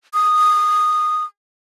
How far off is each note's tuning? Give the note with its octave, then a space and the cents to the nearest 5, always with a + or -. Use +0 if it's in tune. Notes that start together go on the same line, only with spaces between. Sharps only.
D#6 -10